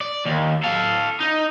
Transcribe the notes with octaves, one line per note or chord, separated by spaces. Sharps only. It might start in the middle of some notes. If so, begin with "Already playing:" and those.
D5
D#2
A4 F5
D#4